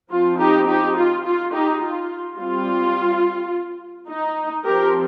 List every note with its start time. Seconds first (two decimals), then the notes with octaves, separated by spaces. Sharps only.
0.11 F3 C4 F4
0.38 D#4 G4
0.67 D#4 G4
0.96 F4
1.24 F4
1.53 D#4 G4
1.81 F4
2.37 G3 C4 F4
4.09 D#4
4.65 F3 C4 G4 A#4